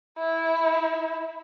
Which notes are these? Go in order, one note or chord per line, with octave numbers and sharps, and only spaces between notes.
E4